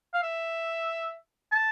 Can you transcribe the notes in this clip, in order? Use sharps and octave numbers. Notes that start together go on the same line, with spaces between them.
F5
E5
A5